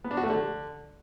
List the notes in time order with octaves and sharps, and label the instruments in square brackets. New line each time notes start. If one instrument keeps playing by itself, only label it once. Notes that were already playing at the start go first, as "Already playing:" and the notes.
[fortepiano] B3
D4
F#4
A3
D3